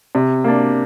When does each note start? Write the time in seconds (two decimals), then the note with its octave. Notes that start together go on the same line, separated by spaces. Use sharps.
0.15 C3
0.44 A#3 D4